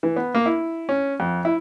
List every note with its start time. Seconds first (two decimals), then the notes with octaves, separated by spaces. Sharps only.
0.03 E3
0.16 B3
0.35 A#3
0.46 E4
0.89 C#4
1.20 F2
1.45 E4